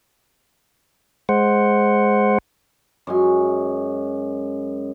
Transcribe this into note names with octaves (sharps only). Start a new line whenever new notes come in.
G#3 C5 F#5
F#2 G#3 G#5